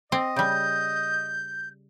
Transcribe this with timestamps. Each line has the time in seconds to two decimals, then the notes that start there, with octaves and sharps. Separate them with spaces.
0.12 C4 D#5
0.36 C#3 G3 G6